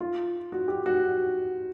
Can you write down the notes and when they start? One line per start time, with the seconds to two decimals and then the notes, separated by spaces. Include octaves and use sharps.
0.01 F4
0.52 F#4
0.68 G4
0.86 F#4